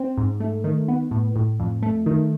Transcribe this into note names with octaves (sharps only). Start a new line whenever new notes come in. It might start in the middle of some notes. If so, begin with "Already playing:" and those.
Already playing: C4
G#2
A3
D#3
B3
A2
A2
F2
A3
D#3